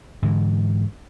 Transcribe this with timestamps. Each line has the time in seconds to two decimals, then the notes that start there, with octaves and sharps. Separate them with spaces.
0.22 G#2 D3 E3